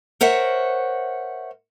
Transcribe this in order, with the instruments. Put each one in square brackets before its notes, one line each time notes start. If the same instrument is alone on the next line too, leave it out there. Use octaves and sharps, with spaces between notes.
[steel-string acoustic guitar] A#4 C5 C#5 E5 F#5